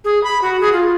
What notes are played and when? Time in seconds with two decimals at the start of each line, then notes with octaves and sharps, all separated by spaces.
0.05 G#4
0.24 B5
0.42 F#4
0.61 G#4
0.73 F4